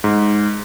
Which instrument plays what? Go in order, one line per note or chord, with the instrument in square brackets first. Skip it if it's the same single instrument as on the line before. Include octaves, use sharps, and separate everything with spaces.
[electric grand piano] G#2